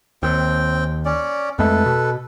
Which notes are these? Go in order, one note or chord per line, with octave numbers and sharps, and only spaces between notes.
D#2 C4 G5
C#4 D5
F2 G#3 A3 A4 B4
B2